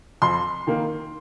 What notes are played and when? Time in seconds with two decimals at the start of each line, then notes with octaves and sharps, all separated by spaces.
0.22 F2 C6
0.67 D#3 A#3